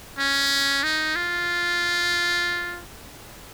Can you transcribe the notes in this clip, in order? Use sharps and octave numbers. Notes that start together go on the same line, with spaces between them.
C#4
D#4
F4